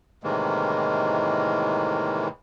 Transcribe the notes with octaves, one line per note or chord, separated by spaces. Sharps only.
A2 C3 D#3 E3 G#3 A#3